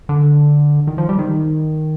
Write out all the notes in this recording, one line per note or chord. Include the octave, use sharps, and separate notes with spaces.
D3
D#3
F3
G3
D#3